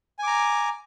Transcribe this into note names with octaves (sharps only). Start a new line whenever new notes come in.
G#5 A#5 D6